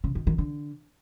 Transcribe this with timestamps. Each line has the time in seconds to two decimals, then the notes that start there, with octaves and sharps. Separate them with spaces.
0.04 C#3
0.15 D#3
0.27 D#3
0.38 D3